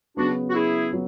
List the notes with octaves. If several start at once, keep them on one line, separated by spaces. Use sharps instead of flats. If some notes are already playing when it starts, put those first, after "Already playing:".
C#3 F#3 B3 D4 F#4
F#4
E4 G#4
F#3 B3